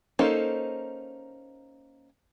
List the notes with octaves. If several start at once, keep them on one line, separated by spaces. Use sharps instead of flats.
A#3 C#4 D#4 A4 C5